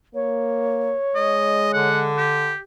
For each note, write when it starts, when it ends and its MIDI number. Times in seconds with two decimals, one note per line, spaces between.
0.15 0.95 58
0.15 1.88 73
1.15 2.21 56
1.15 1.73 75
1.73 2.51 50
1.73 2.01 78
2.17 2.59 67